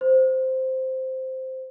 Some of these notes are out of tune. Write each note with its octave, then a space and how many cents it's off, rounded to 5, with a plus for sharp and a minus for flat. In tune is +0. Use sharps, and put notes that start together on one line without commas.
C5 -5